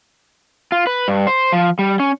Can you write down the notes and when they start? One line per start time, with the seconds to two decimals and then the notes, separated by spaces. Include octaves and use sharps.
0.72 F4
0.87 B4
1.08 G2
1.27 C5
1.52 F3
1.79 G3
2.00 C#4